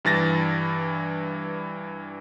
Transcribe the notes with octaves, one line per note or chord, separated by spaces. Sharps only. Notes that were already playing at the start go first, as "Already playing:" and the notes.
G2 E3 A6 A#6